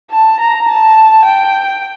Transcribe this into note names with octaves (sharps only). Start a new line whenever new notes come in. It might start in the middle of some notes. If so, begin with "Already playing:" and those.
A5
A#5
A5
G5